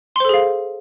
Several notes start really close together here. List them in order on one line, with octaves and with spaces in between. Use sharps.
C6 C5 A4 G#4 F5